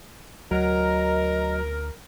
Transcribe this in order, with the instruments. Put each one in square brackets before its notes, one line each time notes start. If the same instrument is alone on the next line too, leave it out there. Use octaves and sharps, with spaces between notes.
[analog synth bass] D2 [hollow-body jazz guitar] F#3 [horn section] A#4 [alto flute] D#5